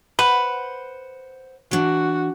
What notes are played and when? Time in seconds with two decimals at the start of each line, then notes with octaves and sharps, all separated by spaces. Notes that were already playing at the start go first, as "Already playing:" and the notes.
0.19 B4 C5 F#5
1.71 E3 D4 F#4